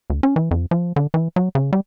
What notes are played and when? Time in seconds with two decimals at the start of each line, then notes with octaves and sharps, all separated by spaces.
0.10 D2
0.23 C#4
0.36 E3
0.51 F2
0.71 F3
0.96 D3
1.14 E3
1.36 F#3
1.55 C#3
1.73 G3